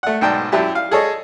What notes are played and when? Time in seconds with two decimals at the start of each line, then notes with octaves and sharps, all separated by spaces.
0.03 A3 F#5
0.21 B1 G#2 G5 A5
0.52 F#2 E4 G4 A5
0.75 F5
0.91 G#4 A4 C#5 D#5